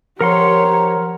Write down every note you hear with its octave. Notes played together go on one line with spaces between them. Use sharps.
F3 G4 A#4 C#5 F#5 A#5 C6